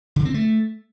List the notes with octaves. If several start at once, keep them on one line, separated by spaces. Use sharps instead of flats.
D3
C4
A3